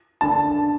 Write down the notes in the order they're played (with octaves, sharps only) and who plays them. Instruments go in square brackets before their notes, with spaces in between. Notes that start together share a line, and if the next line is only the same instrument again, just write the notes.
[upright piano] D3 [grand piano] A5